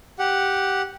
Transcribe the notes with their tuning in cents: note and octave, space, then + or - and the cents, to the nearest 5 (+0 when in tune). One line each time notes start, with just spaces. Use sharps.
G4 -5 F#5 +0